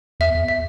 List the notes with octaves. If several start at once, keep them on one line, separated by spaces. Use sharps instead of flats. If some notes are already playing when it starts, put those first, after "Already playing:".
E2 E5
E2
E5